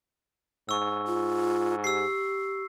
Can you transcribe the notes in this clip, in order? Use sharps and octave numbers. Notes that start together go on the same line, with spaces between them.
G#2 C#6 E6
F4
G4 E6 C7